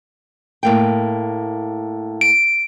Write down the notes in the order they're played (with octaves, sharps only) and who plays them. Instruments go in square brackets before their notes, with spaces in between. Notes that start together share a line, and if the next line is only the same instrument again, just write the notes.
[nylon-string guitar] A2 A#3 G5
[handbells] D7